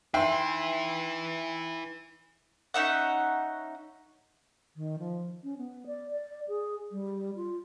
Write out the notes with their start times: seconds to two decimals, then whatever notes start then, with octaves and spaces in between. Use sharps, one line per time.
0.14 D#4 E4 B4 E5 G5 C6 C7
2.74 C#4 D#4 E5 F#5
4.76 D#3
4.99 F3
5.44 C#4
5.58 B3
5.87 D5
6.11 D5
6.48 G#4
6.92 G3
7.36 F4